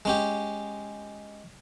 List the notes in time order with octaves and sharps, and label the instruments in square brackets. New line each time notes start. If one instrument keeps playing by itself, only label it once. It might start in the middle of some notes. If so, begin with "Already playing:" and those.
[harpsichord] G#3 C#4 G4